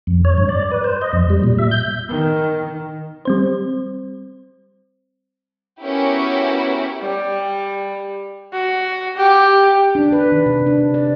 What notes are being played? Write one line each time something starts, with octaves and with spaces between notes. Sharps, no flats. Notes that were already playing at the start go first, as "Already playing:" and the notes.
F2
C#5
G2
D5
B4
C5
D#5
F2
G3
A#2
E5
G6
D#3
G3 C4 C5
B3 C#4 E4 F#4 G4 A#4
G3
F#4
G4
D4
B4
D#3
C3
D4
D5